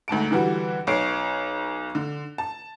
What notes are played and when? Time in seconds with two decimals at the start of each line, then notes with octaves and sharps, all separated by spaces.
0.08 D2 G#2 A5 D7
0.31 D3 E3 G3 F#4
0.87 B1 C#5 C7 D7
1.95 D3
2.38 A5